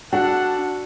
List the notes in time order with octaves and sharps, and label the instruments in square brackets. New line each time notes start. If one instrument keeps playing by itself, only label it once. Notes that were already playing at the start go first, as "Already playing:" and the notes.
[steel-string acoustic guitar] D4 [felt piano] F#4 [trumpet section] G4 A4 F#5